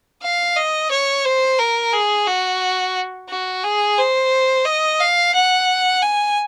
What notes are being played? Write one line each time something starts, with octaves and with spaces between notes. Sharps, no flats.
F5
D#5
C#5
C5
A#4
G#4
F#4
F#4
G#4
C5
D#5
F5
F#5
G#5